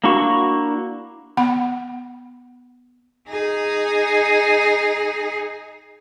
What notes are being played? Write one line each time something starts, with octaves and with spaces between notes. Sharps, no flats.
A#3 D4 E4 F#4 C#6
B3 F#5 B5
D#4 G#4